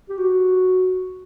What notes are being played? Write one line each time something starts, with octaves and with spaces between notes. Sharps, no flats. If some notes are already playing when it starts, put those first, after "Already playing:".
G4
F#4